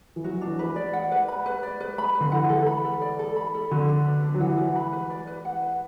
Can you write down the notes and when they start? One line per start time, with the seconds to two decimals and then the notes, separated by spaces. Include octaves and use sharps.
0.16 E3
0.24 F#3 F#4
0.41 D4
0.47 E3
0.59 B4
0.76 D5
0.93 F#5
1.12 B4
1.28 B5
1.46 B4
1.63 D5
1.80 B4
1.98 B5
2.15 B4
2.21 D3
2.32 E3 F#5
2.49 A4
2.67 B5
2.85 A4
3.01 D5
3.19 A4
3.36 B5
3.54 A4
3.71 D3 F#4
3.88 D4
4.06 B4
4.24 D4
4.34 F#3
4.40 E3 F#5
4.58 B4
4.76 B5
4.93 B4
5.10 D5
5.27 B4
5.45 F#5
5.62 B4